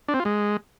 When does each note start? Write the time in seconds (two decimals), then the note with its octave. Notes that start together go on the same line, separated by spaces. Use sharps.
0.08 D4
0.14 C4
0.20 F4
0.25 G#3